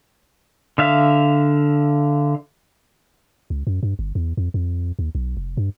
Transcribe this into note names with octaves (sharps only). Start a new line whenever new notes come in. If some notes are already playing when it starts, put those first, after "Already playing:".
D3 E5 F5
C#2
F#2
G2
G1
E2
F2
F2
D#2
B1
F1
G2